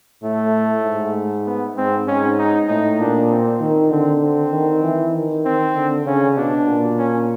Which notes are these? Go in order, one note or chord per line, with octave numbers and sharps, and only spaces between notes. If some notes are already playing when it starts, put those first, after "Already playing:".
A2 A3
G#2
B3
G#2 C4
G#2 C#4
D#4
A2 D#4
A#2 D4
C4
D#3
D3 C4
C4
D#3
E3
D#3
C4
D3
C#3 C#4
B2 D4
A#2
C#4